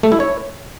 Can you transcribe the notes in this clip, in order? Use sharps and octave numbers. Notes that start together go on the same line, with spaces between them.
A3
E4
C#5